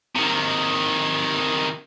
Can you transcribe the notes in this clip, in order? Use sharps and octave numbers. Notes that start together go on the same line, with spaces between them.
C3 D#3